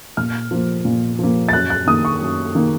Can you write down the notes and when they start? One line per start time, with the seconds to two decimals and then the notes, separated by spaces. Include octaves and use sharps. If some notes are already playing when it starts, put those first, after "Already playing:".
0.17 A#2 F6
0.51 F3 A#3
0.85 A#2
1.19 F3 A#3
1.49 A6
1.53 F#2 F#6
1.70 F#6
1.87 D#3 A#3 D#6
2.05 C#6
2.21 F#2
2.55 D#3 A#3